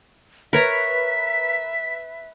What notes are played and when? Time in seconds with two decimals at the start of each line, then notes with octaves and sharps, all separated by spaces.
0.53 A#4 B4 C#5 E5 A#5 B6